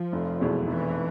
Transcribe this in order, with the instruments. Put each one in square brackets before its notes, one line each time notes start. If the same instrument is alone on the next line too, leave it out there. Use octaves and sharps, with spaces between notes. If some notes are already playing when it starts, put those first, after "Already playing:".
Already playing: [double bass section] F3
[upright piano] F1
E2 B2 G#3 C4
[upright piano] F1 [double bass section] E3